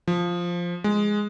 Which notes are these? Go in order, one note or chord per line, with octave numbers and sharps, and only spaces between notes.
F3
G#3